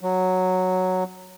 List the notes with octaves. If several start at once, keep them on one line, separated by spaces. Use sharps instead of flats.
F#3